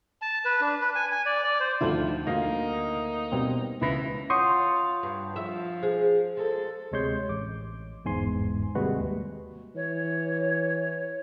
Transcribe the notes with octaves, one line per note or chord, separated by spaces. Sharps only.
A5
B4
D4
B4
G#5
G#5
D5
D5
C5
D2 D#3 F3 E4 F4 A4 F#7
D2 A#3 D#4 F5 A#6
B2 G3 C4
C#2 E3 B5 A#6
F4 C#5 F#5 C6 C#6 D#6 G6
G2
F3 E5
G#4 C5
G#3 A4
D2 C3 G#3 C#5 C6 G6
A1 D6
G1 E2 G#2 G#5 C6
D#2 C3 G3 G#3 F#4 B4
E3 C#5